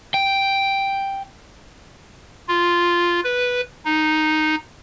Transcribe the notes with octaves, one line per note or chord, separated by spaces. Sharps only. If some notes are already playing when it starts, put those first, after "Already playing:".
G5
F4
B4
D#4